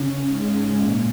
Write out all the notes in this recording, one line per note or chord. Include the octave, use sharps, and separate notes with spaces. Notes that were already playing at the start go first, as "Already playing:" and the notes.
Already playing: C#3 C#4
G#2 G#3
A#2 A#3